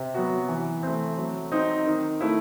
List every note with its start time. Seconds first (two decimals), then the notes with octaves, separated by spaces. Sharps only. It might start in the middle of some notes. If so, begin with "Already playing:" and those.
Already playing: C3
0.14 F#3 B3 F#4
0.49 E3
0.83 A3 C4
1.17 F#3
1.52 C4 D#4
1.86 D#3
2.21 A3 E4